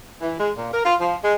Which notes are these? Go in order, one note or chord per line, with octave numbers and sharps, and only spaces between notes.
E3
G#3
A#2
A#4
F4
F3
G#3